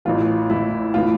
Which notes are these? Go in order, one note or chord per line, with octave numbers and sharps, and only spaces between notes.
A1 A2 E3 F4
A1 A2 E3 E4
A2 E3 F4